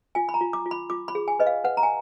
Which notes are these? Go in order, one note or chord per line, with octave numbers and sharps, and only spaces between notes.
F4 G#5
B5
A#5
F4
D6
F4
B5
F4 D6
B5
G#4
G#5
B4 D#5
F5
B4 F#5
A#5
G#5